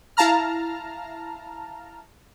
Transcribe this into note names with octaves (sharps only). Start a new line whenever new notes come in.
E4 F5 A5 A#5 F6